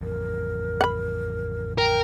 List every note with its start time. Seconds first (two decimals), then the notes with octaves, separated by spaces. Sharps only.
0.01 A1 F2 A#4
0.81 F#5 B5
1.78 A#4 G5